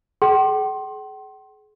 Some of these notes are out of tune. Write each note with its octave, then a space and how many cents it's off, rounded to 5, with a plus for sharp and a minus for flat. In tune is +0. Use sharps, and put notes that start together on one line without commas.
G#4 +35 G5 -45 C6 +25